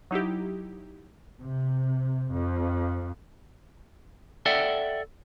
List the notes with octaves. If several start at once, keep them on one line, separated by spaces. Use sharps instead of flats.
F#3 D#4 E4 G4
C3
F2
A4 D5 E5 F#5 G5